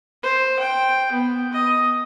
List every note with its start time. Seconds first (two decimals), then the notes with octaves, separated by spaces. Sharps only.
0.23 C5
0.60 G5
1.12 B3
1.53 D#5